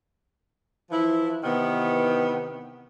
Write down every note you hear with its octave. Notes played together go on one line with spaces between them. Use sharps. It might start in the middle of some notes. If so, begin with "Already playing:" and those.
E3 F3 E4
C3 D#3 E3 B3